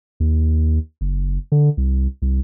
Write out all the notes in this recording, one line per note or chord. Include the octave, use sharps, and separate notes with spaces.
D#2
F#1
D3
C2
C2